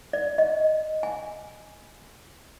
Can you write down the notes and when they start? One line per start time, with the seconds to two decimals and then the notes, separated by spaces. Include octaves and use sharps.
0.13 D5
0.38 D#5
1.03 G#5